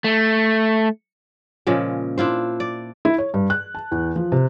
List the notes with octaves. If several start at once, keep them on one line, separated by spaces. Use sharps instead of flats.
A3
A#2 C#3 F3 G#3
D4 E4 F4 C5
D5
E4
C#5
G2
F#6
A5
E2
F3
C3